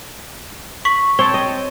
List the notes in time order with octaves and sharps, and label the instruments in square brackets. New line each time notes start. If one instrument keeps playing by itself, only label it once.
[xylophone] C#6 B6 F#7
[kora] C4 [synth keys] C#5 G5 A5 [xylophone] G7
[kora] D#5